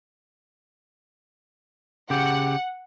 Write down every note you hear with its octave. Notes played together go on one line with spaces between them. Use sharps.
C#3 G4 F#5